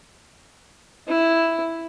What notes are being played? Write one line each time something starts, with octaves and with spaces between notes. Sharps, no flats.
E4